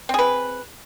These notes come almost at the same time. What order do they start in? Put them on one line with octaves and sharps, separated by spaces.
C4 G#4 B4